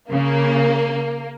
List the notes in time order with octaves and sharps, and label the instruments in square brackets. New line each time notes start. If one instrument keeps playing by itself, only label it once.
[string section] C#3 [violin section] A#3